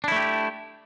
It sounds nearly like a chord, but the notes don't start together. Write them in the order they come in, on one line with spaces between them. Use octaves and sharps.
D4 E4 A3 G4